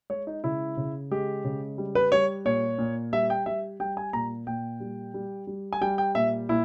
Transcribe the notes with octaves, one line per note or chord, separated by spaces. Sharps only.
G#3 C#5
D#4
C#3 E4
C#3
G#3 G4
C#3
G3
B4
G3 C#5
A#2 C#5
A#2
G3 E5
G5
G3 E5
G3 G5
G#5
A#2 A#5
A#2 G5
G3
G3
G3
G#5
G3 G5
G5
A#2 E5
A#2 E4